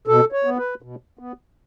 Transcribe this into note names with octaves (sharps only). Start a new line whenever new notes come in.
B2 A4
C#5
B3
B4
B2
B3